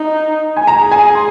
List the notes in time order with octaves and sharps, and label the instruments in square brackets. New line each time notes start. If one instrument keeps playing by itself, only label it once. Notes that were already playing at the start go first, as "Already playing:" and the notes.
Already playing: [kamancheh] D#4
[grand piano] G#5
[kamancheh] G#4 [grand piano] A#5
[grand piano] G#5
C6